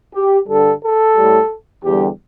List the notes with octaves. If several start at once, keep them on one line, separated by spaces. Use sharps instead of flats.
G4
G2 D3 G3 A4
A4
A2 G3
E2 D3 G3 G4